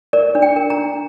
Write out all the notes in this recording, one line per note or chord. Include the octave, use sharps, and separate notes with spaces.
A#4 D5
D4
G5
A#4
A#5
D4